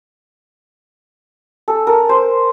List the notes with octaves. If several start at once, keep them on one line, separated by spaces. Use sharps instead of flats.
A4
A#4
C5